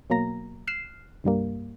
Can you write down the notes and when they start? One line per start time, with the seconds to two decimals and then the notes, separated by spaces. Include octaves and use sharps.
0.10 B2 F#3 A#3 A#5 A#6
0.67 F6 F#6 C7 E7
1.24 C2 G2 G3 A#3